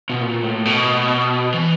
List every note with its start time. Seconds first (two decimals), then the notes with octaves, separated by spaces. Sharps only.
0.10 B2
0.21 A#2
0.43 A2
0.65 B2
1.54 E3